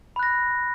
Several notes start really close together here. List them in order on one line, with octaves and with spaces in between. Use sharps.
B5 F#6 A#6